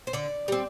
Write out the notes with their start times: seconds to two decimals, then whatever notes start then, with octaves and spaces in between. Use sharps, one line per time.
0.07 C5
0.13 D3 D5
0.48 G3 C4